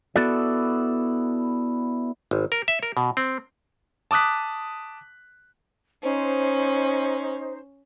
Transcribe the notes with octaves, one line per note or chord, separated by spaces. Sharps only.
B3 E4 F#4 A4 D5
G#1
A#4
E5
A#4
B2
C4
A5 D6 D#6 F#6 B6
C#4 D#4 C5